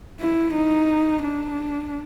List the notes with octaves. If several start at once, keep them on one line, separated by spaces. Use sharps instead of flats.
E4
D#4
D4